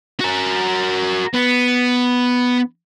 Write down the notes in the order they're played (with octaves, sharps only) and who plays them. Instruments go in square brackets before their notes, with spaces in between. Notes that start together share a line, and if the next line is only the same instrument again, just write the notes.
[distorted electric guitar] F#4 A#4
B3